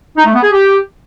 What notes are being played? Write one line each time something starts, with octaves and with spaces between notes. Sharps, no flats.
D#4
A3
B3
G#4
G4